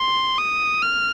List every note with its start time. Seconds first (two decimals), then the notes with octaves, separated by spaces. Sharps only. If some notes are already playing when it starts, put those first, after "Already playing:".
Already playing: C6
0.38 D#6
0.83 F6